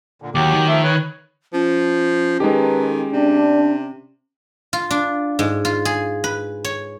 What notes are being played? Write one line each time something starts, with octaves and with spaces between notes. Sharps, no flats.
A#2 D3
D#2 F#3 G4 D6
D#3
F3 A3 E5
B4 C#5
F3 C#4
D#3 G#3 D#4 G4 A4 B4
C3 D4
F4
D4
G#2
F4
G#4
B4
C#5